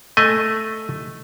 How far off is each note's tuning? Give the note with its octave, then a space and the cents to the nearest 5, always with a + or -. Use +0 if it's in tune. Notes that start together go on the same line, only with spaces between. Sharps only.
A3 +0 D#5 +0 G#5 +0